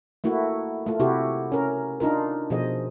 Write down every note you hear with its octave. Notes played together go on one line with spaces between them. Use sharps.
A3 A#3 E4 F#4
A3 F4
C3 E4 F#4 G4
C#4 A#4
D4 D#4 F4 A#4
B2 F3 G#4 C5 D#5